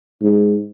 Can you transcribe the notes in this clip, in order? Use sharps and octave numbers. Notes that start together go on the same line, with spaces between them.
G#2